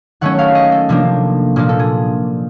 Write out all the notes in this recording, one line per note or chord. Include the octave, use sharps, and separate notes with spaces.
D#3 F#3 A3 C#4 F#5
F5
D#5
A4
C3 F3 A#3 D4
A#2 F3 A#3 D4 F4
A4
G#4